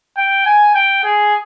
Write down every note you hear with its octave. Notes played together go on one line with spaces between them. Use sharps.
G5
G#5
G5
G#4